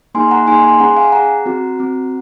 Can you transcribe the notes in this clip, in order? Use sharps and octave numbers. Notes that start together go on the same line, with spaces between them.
A#3 D#4 G#4 G#5 C6
F#5 A#5
A#3 D#4 G#4 G#5 C6
G#5 C6
C#4 G#4 F#5 A#5
F5 G#5
C#4 G#4 F#5 A#5
C4 F#4
C4 F#4